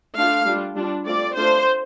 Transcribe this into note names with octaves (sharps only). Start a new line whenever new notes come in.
A3 D4 F4 F5
G3 D4 F4
G3 D4 F4
A3 C4 F4 D5
A3 D4 F4 C5